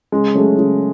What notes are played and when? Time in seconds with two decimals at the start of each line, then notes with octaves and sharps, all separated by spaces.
0.12 C#3 G#3
0.35 F#3 A3 C#4 G#4
0.58 C#3